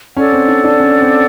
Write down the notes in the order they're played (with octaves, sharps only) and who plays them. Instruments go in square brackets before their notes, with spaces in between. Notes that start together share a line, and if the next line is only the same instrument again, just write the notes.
[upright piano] C#4 [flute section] A4 D5 F#5
[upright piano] C4
D4
D4
C#4
C4